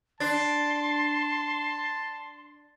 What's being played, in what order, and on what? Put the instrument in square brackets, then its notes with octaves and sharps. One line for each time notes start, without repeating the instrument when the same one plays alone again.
[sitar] D4 [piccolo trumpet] A5 [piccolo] C6 [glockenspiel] A6